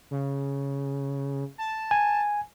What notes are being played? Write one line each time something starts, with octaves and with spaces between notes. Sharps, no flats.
C#3
A5
G#5